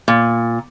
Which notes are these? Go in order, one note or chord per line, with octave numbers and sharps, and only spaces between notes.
A#2